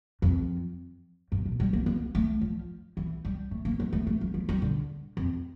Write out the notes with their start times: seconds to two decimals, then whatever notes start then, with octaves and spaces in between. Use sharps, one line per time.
0.22 F2
1.32 G2
1.46 A#2
1.60 G3
1.73 A#3
1.86 A#3
2.15 A3
2.41 F3
2.97 E3
3.25 G3
3.51 A3
3.65 A#3
3.80 A3
3.93 A3
4.07 A3
4.21 F3
4.34 F3
4.49 G3
4.62 D3
5.17 F2